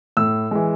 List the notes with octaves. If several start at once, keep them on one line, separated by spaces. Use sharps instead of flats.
A2 E6
E3 G#3